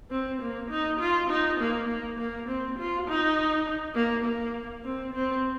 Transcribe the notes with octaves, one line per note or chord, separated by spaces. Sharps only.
C4
A#3
D#4
F4
D#4
A#3
A#3
A#3
C4
F4
D#4
A#3
A#3
C4
C4